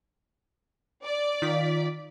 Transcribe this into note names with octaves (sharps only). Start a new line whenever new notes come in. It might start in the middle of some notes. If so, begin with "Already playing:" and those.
D5
D#3 F4 B6